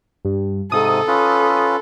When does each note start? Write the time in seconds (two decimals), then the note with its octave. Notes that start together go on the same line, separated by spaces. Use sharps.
0.25 G2
0.72 G#2 C3 A4 D#6
1.08 C#4 F4 B4